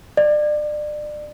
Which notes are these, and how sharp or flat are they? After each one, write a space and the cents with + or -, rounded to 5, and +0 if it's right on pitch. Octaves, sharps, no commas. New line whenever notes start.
D5 +30